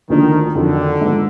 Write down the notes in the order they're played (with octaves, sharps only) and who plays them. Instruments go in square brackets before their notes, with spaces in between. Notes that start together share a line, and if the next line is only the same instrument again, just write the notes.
[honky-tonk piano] D2 D3 F3 A#3 D4 [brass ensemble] D#3
[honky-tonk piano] F2 D#3 F#3 D4 F#4 [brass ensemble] D3
[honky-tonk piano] G#2 F3 B3